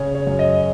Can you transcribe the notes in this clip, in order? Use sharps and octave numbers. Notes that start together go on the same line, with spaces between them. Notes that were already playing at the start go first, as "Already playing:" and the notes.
Already playing: C#3 C#5
C#5
F#2
D#5